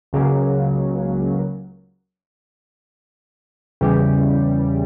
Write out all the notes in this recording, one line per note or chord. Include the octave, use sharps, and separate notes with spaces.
C#2 C#3 F#3 A#3
E2 C#3 E3 G3